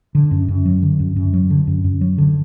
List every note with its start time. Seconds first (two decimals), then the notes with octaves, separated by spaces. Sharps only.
0.15 D3
0.31 F#2
0.48 F#2
0.65 F#3
0.82 D3
1.00 F#2
1.16 F#2
1.33 F#3
1.50 D3
1.67 F#2
1.84 F#2
2.01 F#3
2.18 D3